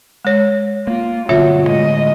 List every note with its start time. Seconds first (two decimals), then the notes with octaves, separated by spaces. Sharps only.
0.25 G#3 C#5
0.87 A#3 F4
1.29 G2 B2 D3 F#3 F4 C#5 E5
1.67 A2 D3 G#3 D#5